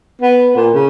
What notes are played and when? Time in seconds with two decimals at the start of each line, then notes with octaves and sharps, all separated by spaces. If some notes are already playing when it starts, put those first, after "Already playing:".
0.22 B3
0.56 A#2
0.74 C#3